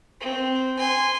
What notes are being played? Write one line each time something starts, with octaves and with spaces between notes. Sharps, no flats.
C4
G#5 C6